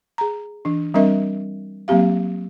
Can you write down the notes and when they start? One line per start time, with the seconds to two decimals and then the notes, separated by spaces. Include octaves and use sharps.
0.18 G#4 A#5
0.65 E3 D4
0.94 G3 C4 D4 A#4 D#5 E5
1.88 F#3 A#3 C4 G4 F5